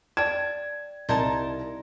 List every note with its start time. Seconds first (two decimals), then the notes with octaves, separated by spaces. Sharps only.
0.17 D5 G5 A5 G#6
1.09 C2 D#4 A#4 D5 A5 C6 G#6